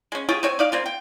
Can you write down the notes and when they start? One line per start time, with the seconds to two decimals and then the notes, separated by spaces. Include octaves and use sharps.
0.12 G#3 C#4
0.29 F4 G4 G#4 C#5
0.43 C4 C#5 G#5
0.59 D#4 D5 F5
0.72 A#3 C4 F4
0.86 G5